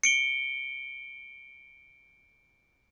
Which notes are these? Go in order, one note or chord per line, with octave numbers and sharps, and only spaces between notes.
C#7 D7 G7